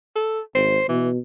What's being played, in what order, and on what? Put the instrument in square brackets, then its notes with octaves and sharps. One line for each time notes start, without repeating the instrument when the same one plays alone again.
[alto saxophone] A4
[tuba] G#1 [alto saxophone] C5
[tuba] B2 [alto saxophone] E3